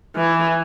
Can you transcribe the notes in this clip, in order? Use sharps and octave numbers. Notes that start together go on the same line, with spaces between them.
E3